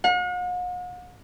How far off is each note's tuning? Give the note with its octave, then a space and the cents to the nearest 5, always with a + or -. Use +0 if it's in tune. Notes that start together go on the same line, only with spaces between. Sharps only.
F#5 -45